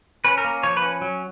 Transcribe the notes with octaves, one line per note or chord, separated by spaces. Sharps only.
C#4 B4
A#4
A#3
F3 C#5
B4
C#4
F#3